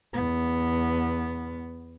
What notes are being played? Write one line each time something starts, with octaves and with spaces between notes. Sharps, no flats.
E2 B3